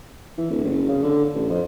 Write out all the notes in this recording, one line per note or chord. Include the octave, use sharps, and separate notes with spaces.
E3
D1
F#1
C#3
D3
A1
F2